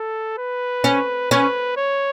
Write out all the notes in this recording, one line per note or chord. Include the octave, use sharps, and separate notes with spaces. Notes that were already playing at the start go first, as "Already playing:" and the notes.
Already playing: A4
B4
C#4
C#4 B4
C#5